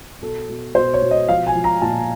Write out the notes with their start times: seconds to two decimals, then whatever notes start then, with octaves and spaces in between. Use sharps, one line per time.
0.22 B2 A4
0.49 B2
0.75 B2 C5
0.94 C#5
1.02 B2
1.11 D#5
1.28 F3 F5
1.47 G#5
1.55 F3
1.64 A#5
1.82 A#2 A5